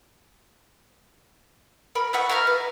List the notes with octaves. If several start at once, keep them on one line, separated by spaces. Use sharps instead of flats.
A#4 B5
B4 E5 F#5 C#6
E5 F5 A#5 F6
B4